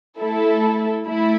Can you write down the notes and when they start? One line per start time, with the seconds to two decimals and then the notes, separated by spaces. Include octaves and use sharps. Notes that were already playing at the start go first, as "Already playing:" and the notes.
0.20 A3 E4 A4
1.07 A3 E4